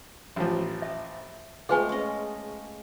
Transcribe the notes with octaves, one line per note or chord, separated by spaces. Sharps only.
A1 F3
E5
G#3 A3 C4 F4 G#4 B4 G#5
C#4 D#5